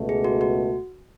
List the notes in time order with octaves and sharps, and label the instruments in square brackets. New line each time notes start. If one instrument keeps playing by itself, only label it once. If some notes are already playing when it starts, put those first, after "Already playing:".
Already playing: [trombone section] C#2 B2 A3
[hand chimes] G#4
F#4
F#4